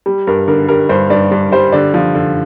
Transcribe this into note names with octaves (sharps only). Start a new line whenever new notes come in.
G3
G2 A#4
D3 A#4
G3 A#4
G2 C5
G2 D5
G2
G3 C5
D3 D5
F3
D3